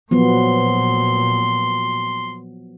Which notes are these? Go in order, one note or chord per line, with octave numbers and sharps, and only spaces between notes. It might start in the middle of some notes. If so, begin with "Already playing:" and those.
A#2 F3 F#3 B3 C6